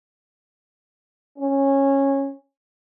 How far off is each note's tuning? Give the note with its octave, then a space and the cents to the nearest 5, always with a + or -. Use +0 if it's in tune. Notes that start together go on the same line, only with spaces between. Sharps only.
C#4 -15